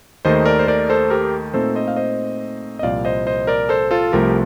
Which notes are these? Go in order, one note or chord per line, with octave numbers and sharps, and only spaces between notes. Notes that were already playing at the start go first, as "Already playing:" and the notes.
D#2 D#3 A3 D#4 C5 D#5
A#4 D5
C5
A#4 D5
A4 C5
G4 A#4
A#2 A3 C4 D#4 A4 C5
C5 D#5
F5
C5 D#5
D#5
C2 A#2 F3 D5 F5
C5 D#5
C5 D#5
A#4 D5
A4 C5
F4 A4
C2 C3 F3 A3 G4 A#4